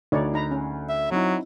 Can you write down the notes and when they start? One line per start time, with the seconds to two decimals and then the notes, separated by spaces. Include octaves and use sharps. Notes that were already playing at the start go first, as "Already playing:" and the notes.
0.12 D2 D#4 C#5 D5
0.34 D#4 A#5 B5
0.51 C#4
0.89 E5
1.11 F#3 C4 D#4 E4